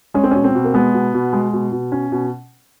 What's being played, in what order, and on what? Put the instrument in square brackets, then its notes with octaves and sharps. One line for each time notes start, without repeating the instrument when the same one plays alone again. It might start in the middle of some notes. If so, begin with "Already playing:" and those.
[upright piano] G#3 [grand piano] C#4
[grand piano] C4
[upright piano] B2 [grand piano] C#4
[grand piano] C4
[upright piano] B2
[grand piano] A#3
[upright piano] G#3 [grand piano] B3
[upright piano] B2
B2
G#3
B2
B2
C#4
B2